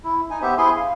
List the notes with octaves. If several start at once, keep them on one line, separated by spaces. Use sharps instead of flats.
E4
D#4 G#5
B3 G4 C5 E5
E4 G#4 G#5 C6
F5